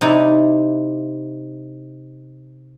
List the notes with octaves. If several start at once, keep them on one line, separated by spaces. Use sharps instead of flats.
C3 D#4 E4 D5